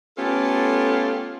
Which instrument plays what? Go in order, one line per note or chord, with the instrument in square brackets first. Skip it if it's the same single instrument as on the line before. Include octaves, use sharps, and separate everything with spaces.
[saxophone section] A3 B3 C#4 F4 G4 A4